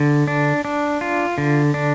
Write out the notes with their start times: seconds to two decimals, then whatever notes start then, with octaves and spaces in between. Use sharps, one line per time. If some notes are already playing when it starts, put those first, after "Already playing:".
Already playing: D3
0.28 D4
0.65 D4
1.01 F4
1.38 D3
1.74 D4